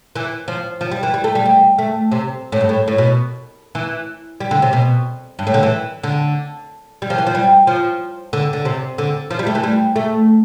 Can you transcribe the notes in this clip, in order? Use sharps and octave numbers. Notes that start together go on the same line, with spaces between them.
E3
F3
F3
G3
E3
G3
A3
G3
G3
A3
C3
A2
G2
A2
A2
B2
E3
G3
D3
C3
B2
G2
A2
D3
E3
D3
G3
F3
E3
F3
G3
F3
D3
D3
C3
D3
F3
G3
A3
E3
G3
A3